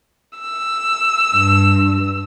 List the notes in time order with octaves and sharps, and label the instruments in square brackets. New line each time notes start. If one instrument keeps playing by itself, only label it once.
[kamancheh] E6
[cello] G2